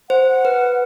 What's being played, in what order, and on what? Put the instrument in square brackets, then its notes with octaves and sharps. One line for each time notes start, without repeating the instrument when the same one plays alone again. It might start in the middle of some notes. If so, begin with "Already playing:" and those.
[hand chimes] C5 [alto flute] F#5
[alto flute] F#5
[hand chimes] B4